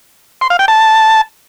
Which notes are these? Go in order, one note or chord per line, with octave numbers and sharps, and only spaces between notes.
C6
F5
G5
A5